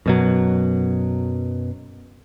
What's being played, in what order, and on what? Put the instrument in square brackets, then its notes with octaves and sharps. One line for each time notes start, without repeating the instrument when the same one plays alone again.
[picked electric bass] F#2 B2 F#3